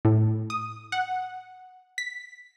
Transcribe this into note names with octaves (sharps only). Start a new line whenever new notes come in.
A2
D#6
F#5
B6